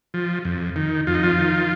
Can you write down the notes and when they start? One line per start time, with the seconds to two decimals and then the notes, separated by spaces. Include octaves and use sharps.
0.14 F3
0.45 F2
0.76 D#3
1.07 F2 F4
1.14 D#4
1.23 F3 F4
1.38 D#3